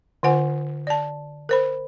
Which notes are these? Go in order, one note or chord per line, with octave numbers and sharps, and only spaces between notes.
D3 F4 C5 F#5 G#5
D5 A5
A#4 C5 B5